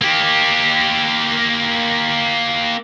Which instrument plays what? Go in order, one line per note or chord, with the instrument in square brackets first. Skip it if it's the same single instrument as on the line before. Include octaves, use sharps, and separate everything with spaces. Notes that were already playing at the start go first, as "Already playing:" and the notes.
[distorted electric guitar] A#3 G4